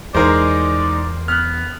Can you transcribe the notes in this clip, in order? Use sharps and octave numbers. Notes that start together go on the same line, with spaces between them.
E2 G#3 D#4 G#4 A#4 C5 D5
B3 F6 F#6